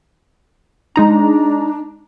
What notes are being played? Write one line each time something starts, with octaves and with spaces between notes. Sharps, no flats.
G#3 D4 D#4 A#5